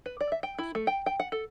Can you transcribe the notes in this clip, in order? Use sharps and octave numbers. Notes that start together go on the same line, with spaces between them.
B4
D5
E5
G5
E4
A3
G5
G5
F#5
A4